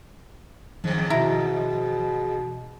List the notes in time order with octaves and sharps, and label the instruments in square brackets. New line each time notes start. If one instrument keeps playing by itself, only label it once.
[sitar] E2 G#2 [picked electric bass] D#3 F3
[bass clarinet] B2 [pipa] E4 A#5